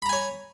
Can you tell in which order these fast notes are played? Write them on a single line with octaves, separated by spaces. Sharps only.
B5 A#5 G#5 C#5